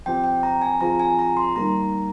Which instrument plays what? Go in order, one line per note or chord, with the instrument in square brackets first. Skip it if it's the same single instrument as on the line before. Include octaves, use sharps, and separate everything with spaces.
[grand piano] F3 C4 G4 [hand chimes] G5
[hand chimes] G5
A#5
G#5
[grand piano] F3 C4 F4 G#4 [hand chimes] A#5
[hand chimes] G#5
A#5
C6
[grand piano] D#3 G3 A#3 [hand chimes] A#5